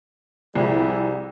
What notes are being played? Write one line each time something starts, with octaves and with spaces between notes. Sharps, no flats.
C2 F3 G3 E4 G#4